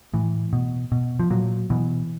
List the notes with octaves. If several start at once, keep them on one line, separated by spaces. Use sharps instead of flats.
A2 E3
B2
B2
F3
A#2 F#3
B2 E3